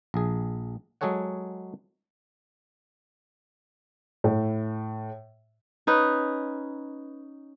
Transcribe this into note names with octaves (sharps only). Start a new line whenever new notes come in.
A#1 G#4
F#3 G#3 G#4 A4 C#5 F#5
A2
C#4 D#4 B4